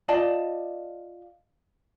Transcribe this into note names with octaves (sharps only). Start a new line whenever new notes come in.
F4 D5 D#5 A5